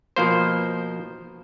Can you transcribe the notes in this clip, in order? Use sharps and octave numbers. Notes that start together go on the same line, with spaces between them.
B2 F3 A#3 C5